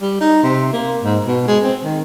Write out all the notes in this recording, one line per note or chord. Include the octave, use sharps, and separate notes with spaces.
G3
D#4
C3
A#3
G#2
B2
G#3
C4
D#3